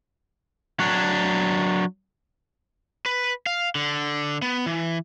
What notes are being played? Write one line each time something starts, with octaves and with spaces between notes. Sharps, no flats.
F#3 D4
B4
F5
D3
B3
E3